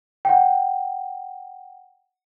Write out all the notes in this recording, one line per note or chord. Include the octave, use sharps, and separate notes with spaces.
F#5 G5